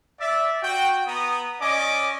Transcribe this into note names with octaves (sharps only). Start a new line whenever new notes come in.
D5 E5
F#4 G5
B3 A#5 D#6
C#4 D5 D#5 G#5 D6